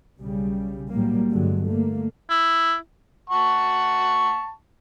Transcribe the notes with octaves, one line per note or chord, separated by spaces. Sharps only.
B1 C#3 G3
A2 F#3 G3 A#3
G2 D3 F#3 G#3
D3 A3 A#3
E4
F#5 A5 C#6